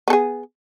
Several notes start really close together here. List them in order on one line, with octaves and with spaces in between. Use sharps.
B3 A4 G#4